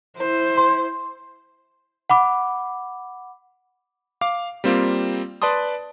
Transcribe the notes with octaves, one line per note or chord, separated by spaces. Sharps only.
E4 C5
C6
F#5 B5 D6
F5 D6
G3 A#3 C4 F4
B4 D5 A5 C6 D#6